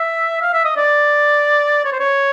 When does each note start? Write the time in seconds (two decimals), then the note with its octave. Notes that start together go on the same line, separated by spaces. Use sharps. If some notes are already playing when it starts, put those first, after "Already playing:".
Already playing: E5
0.42 F5
0.53 E5
0.65 D#5
0.77 D5
1.85 C#5
1.93 C5
2.00 C#5